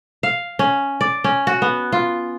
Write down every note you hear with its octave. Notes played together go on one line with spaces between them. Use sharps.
F5
C#4
D5
C#4
F#4
B3
F4